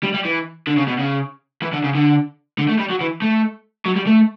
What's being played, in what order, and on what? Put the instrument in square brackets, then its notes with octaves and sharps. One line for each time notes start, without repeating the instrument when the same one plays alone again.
[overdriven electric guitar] G3
G3
E3
D3
C#3
B2
C#3
E3
D3
C#3
D3
D3
A3
G3
F#3
E3
A3
F#3
G3
A3